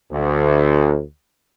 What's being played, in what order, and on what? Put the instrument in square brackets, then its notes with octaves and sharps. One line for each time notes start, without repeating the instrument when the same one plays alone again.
[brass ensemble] D2